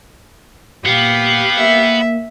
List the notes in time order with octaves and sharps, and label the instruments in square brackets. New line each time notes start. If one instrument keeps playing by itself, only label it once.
[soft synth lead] A#2 [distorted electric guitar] B3 [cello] G4 F5
[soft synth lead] A#3 [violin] E5